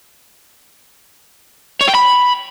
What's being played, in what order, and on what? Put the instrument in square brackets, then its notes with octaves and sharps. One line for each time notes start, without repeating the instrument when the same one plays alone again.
[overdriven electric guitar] C#5
G5
B5